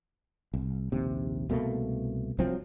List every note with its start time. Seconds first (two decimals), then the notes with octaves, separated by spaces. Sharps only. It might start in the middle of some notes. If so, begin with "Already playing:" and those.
0.54 C2
0.92 A#1 D#2 C3
1.49 C2 B2 A3 A#3
2.39 C2 F3 F#3 C4